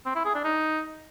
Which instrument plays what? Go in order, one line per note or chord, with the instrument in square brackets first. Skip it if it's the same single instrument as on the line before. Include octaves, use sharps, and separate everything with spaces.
[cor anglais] C4
E4
G#4
D4
D#4